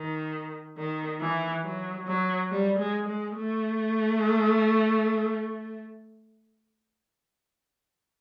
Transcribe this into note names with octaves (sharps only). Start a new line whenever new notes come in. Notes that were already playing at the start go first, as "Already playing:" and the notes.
Already playing: D#3
D#3
E3
F#3
F#3
G3
G#3
G#3
A3